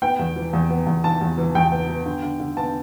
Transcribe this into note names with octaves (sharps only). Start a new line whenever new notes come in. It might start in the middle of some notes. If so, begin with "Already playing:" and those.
B3 G5
E2
E3
E2
B3
E2
E3 A5
E2
E3
E2 G5
B3
B3
D3
D3
D3
B3 A5